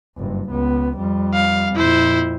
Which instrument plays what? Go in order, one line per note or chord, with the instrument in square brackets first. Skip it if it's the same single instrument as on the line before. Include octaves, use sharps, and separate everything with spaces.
[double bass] F#1 G2
C#2 B3
F2 G3
[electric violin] F5
[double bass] F2 A#2 [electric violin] E4 C5